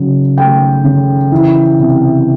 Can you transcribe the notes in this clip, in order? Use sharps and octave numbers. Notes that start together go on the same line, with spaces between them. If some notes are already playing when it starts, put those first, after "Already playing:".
Already playing: C#3 F#3
A3 G5
C#3
E3
C3